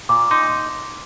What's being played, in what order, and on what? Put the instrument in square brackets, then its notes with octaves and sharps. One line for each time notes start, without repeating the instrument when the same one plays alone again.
[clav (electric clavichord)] A#2 [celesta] D6
[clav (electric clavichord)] D#4 [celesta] C6